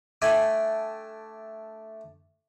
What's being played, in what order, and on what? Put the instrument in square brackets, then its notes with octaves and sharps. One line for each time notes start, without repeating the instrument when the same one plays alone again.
[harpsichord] A3 D4 E5 G5 G#5